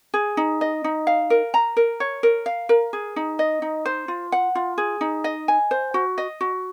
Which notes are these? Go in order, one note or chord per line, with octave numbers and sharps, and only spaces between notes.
G#4
D#4
D#5
D#4
F5
A#4
A#5
A#4
C#5
A#4
F5
A#4
G#4
D#4
D#5
D#4
C5
F4
F#5
F4
G#4
D#4
D#5
G#5
C5
F#4
D#5
F#4